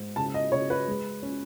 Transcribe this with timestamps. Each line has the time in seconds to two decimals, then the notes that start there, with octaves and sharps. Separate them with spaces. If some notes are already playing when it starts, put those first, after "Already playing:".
Already playing: G#2
0.16 C#3 A5
0.34 D#5
0.52 C#3 C#5
0.70 B4
0.88 G#3
1.23 C#4